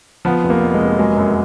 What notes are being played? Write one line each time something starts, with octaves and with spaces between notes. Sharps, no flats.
F3 B3
F1
A#3
F2
G#3
F1
F#3 G#3
F#2